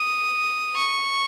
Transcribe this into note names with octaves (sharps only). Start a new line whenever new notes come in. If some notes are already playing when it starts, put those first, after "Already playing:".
Already playing: D#6
C#6